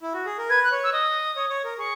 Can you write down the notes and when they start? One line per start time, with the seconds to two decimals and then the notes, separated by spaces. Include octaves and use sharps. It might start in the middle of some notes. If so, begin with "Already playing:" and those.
0.01 E4
0.14 F#4
0.25 G#4
0.38 A#4
0.50 B4 G#6
0.64 F#6
0.71 C#5
0.84 E6
0.93 D#5 D#6
1.36 C#5
1.50 C#5
1.64 A#4
1.78 G#4 C#6